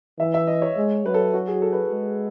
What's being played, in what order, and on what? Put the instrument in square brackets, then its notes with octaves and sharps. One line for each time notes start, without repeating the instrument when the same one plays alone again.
[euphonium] E3 [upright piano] E5
[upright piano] E5
D#5
C#5
[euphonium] G#3
[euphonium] F#3 [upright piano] B4
[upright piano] A4
F#4
G#4
A4
B4
[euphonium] G#3